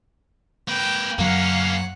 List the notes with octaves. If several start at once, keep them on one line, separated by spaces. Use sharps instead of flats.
A#3 B4 G5
F#2 F#3 A#3 C#4 F5 F#5